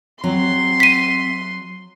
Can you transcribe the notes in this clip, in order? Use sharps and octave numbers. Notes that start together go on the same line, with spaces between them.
F#3 C4 C6
B6 D#7